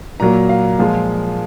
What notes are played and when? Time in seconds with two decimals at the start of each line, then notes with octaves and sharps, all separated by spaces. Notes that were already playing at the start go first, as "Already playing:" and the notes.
0.20 A#2 F#3 A#3 A#5
0.49 F5
0.78 A#2 F3 G#3